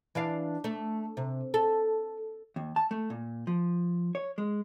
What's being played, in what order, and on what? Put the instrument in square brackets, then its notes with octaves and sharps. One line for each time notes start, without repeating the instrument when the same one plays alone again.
[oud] E3 D4 F5
A3
C3
A4
[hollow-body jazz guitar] D#2
A5
A3
A#2
F3
C#5
G#3